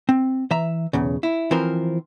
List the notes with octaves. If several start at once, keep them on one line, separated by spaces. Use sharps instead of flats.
C4
E3 E5 A#5
B1 E2 C#3
E4
E3 F3 C4 A#4 C5